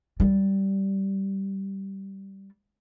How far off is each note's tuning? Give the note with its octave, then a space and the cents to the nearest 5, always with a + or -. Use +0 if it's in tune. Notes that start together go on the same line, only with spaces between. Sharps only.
G3 -10